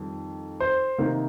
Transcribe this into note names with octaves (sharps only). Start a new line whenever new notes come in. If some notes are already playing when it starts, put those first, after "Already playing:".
Already playing: F2 D#3 G3
C5
C3 D#3 A#3 D#4